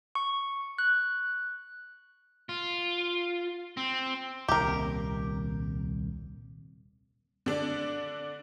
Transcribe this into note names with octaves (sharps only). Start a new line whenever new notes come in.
C#6
F#6
F4
C4
D#1 C2 A#2 G4 A#4
D3 D4